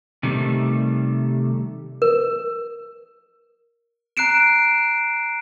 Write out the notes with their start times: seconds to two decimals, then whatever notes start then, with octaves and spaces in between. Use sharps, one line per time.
0.23 C3 D#3 G3 A3
2.02 A#4
4.17 A#5 F#6 C7 D7 E7